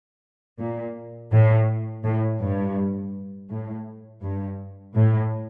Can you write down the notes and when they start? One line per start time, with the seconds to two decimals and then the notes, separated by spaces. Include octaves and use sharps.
0.59 A#2
1.32 A2
2.04 A2
2.40 G2
3.50 A2
4.22 G2
4.95 A2